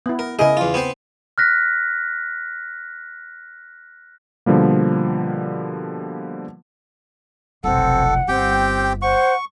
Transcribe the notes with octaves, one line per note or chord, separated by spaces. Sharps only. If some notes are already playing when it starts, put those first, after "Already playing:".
B3 E4
A#4
C#3 E4 G#4 A#4 D#5
E2 F4
B3 C4 C5
F6 F#6 A#6 B6
B2 D3 F3 G3 A#3
F1 B1 C4 A4 F#5
G1 C4 G4 G5
C5 F#5 C#6